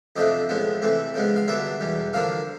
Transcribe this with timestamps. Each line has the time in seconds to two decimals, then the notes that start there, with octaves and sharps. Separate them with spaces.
0.16 F2 C3 F3 A3 D4 D#5
0.49 A2 F3 G#3 B3
0.82 C3 E3 A3 C4
1.14 C#3 F3 G#3 B3
1.36 F5
1.48 G2 D3 F#3 B3 E5
1.80 E2 B2 G3
2.13 D3 F3 A#3 D4 F5